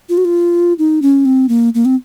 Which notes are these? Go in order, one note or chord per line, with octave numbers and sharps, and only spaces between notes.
F4
F#4
F4
D#4
C#4
C4
A#3
A#3
C4